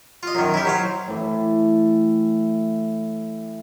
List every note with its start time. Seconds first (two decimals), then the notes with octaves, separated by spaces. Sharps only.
0.23 F4 D#5
0.35 F#2 D#3
0.54 E4 G4
0.65 F#3 C5 F5
1.08 A2 E3